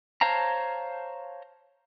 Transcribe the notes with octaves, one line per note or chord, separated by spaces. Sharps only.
C5 C#5 F5 A5 A#5